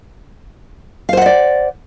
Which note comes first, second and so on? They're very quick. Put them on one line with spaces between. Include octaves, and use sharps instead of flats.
F5 C5 F#5 D#5 D5